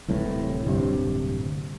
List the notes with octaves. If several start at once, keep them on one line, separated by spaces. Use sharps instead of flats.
D1 C2 A2 E3
D1 G2 C3